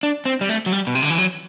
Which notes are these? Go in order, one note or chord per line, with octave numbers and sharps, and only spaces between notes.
D4
C4
G3
A3
F#3
G3
B2
C3
D3
E3
F#3